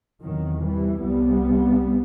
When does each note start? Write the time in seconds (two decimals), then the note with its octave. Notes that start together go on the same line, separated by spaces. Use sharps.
0.22 E2 C3 D#3 F#3
0.63 E3 G3
1.03 C2 C3 G3 B3